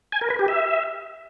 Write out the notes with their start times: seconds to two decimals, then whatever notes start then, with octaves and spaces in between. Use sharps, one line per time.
0.12 G#5
0.21 A#4
0.30 B4
0.39 G4
0.48 E5